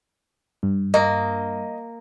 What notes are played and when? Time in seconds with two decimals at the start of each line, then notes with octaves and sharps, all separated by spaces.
0.63 G2
0.94 A#3 D#5